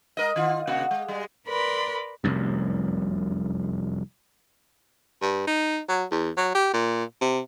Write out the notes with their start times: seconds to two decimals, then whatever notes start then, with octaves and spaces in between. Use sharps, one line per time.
0.17 G#3 A#4 D#5
0.36 D#3 F4
0.67 C3 A#3 F#4
0.91 G#3
1.08 G3 G#3
1.48 A#4 B4 D5 B5 C6
2.24 F1 C2 F#2
5.22 G2
5.47 D#4
5.89 F#3
6.11 E2
6.38 F#3
6.55 G4
6.74 A#2
7.21 C3